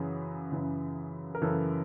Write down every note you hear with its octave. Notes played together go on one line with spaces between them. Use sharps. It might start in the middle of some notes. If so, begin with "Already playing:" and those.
Already playing: F#2 C#3 E3 G#4
F#2 C#3 E3
A#4
F#2 C#3 E3 A4